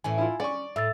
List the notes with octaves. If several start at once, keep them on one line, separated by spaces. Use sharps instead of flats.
A2 E3 C#4 G#5
E4 F4
C#4 D5 C#6
A2 E5 E6 A6